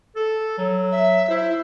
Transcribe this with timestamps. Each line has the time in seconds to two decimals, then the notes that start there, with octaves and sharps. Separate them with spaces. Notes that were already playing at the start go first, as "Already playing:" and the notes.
0.16 A4
0.58 F#3
0.92 E5
1.30 E4 C5